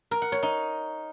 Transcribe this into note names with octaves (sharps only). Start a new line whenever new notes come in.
A#4
F#5
C#5
D#4